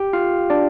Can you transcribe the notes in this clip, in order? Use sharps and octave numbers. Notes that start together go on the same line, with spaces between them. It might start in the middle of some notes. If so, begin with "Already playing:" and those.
Already playing: G4 G5
F4 F5
D4 D5